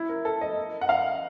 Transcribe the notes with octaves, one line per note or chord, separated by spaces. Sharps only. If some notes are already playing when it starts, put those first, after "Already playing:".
Already playing: E4
A#4
A4
D#5
F#5
F5